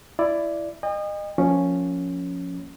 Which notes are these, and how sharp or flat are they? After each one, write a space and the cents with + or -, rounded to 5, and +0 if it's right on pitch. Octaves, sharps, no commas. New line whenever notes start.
E4 +15 D5 +0
D#5 -30 G5 +45
F3 +20 A#3 +0 C#4 +0